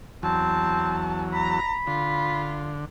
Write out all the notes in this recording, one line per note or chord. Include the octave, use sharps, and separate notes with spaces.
E2 F#3 C4 A5
A#5 B5
D3 F4